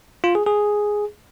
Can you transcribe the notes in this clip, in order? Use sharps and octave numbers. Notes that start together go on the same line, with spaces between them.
F4
G#4
G#4